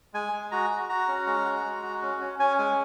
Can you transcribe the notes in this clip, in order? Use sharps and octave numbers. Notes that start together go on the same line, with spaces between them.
G#3 G#5
G#3
F#4 A#5
F#4
F#4 A#5
C#4
G#3
F#4
G#3
F#4
C#4
C#4
C#4 G#5
G#3 G#5